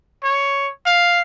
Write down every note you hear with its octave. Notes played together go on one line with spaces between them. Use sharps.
C#5
F5